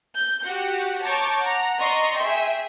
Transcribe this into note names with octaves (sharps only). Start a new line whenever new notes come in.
G6
F#4 G4 F#5
C#5 A5 A#5 C#6 D6 G6
F#5 A#5
D5 D#5 A#5 C6 C#6
G#4 E5 G5